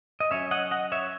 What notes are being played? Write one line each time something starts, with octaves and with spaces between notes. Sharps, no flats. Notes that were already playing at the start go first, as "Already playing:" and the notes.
D#5
F#3 C#4 C#5 E5
D#5 F#5
D#5 F#5
C#5 E5